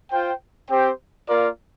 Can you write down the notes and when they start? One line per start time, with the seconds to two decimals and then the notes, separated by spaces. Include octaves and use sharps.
0.11 F4 C5 G5
0.70 C4 G4 C5 G5
1.28 A#3 F4 A#4 D5